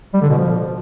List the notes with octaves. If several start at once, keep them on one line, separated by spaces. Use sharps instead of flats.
G3
D3
B2
F3